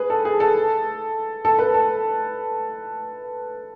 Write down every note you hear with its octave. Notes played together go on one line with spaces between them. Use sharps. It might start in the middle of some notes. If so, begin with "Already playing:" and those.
Already playing: G#4 B4
A4
G#4
A4
A4
B4
A4